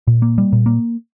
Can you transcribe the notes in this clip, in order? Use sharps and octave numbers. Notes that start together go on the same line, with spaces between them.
A#2
A#3
G3
A#2
A#3